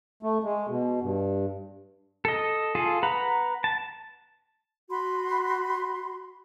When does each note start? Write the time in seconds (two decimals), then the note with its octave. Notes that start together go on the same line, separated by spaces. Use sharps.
0.23 A3
0.43 G#3
0.69 B2
1.01 G2
2.25 A4 D#5
2.75 F4 G#4 A4
3.03 B4 F#5 A#5 B5
3.64 A5
4.89 F#4 B5 C6